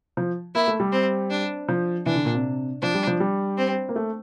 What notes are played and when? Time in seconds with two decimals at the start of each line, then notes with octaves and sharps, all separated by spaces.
0.17 F3
0.54 A#3 E4
0.68 A3
0.80 G3
0.92 C4
1.30 D4
1.69 F3
2.06 E3 D4
2.15 D3
2.25 A#2
2.34 C3
2.82 F3 D4
2.95 G3
3.07 F3
3.20 G3
3.58 C4
3.89 A#3
3.96 A3